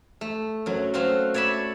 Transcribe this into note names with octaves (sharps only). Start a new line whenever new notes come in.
A3
F#2 F#3
A3 C4 F#4 F5
C#5 D5 E5 A5 B5